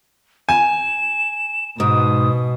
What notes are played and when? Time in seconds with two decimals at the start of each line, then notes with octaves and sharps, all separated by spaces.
0.49 G#5 E7
1.80 G#2 B2 D#6